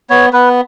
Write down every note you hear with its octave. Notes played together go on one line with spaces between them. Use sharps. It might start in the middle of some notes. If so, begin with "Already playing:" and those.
B3 C#5
B3 B4